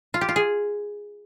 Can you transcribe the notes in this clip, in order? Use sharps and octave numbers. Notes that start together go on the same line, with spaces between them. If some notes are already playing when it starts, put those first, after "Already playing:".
F4
G4
F4
G#4